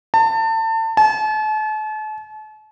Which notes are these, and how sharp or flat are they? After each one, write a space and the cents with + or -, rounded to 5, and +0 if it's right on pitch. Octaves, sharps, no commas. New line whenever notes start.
A5 +30
A5 -40